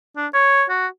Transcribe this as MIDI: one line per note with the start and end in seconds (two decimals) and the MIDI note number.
0.17 0.27 62
0.34 0.65 73
0.70 0.87 66